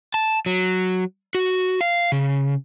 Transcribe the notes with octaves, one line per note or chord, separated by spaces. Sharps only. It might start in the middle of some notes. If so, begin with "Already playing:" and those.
A5
F#3
F#4
F5
C#3